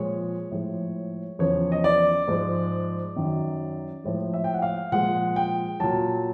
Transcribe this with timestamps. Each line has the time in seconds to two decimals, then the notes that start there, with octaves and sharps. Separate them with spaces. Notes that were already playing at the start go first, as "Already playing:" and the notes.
Already playing: A#2 F3 G#3 C#5
0.51 A2 F3 G#3
1.39 E2 C#3 F3 C#5
1.72 D#5
1.84 D5
2.28 G#2 F3 G#3
3.16 F#2 D#3 F#3
4.04 A2 F3 G#3
4.34 E5
4.44 G5
4.54 F#5
4.62 F5
4.92 A#2 F3 G#3 F#5
5.36 G5
5.80 A#2 F#3 A5